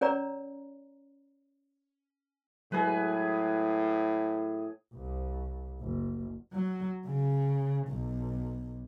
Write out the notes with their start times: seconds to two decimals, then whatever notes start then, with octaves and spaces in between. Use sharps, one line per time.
0.01 C#4 A#4 C#5 D5 A#5
2.72 A2 F#3 G#3 G#4 A#4 B4
4.93 C2
5.81 F#1
6.53 F#3
7.06 C#3
7.89 B1